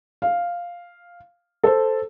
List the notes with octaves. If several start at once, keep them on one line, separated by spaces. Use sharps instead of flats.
F5
A4 C5